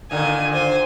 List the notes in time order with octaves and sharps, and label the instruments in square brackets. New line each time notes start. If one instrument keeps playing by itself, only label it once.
[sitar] A#2 D3 D#3 [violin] G#5
[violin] C5 G#5